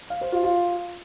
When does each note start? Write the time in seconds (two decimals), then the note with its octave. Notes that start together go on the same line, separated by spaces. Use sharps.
0.10 F5
0.21 C5
0.32 F4
0.43 F4